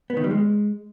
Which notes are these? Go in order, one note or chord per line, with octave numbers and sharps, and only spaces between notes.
B3
D#3
G3
G#3